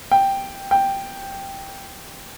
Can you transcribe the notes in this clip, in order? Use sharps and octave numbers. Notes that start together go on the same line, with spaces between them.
G5
G5